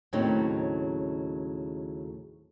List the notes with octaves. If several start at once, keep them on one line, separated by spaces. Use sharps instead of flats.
D#2 A2 C#3 F#3 C4 D#4